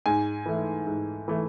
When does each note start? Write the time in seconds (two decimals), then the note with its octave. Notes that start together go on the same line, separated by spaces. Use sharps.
0.06 G#2 G#5
0.46 E3 A3
0.87 G#2
1.28 E3 A3